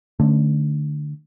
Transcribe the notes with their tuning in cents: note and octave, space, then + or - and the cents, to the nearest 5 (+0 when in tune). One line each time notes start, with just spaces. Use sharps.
D3 +20 A3 +0 C#4 +0